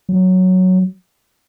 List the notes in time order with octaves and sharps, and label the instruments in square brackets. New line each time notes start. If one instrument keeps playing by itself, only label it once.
[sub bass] F#3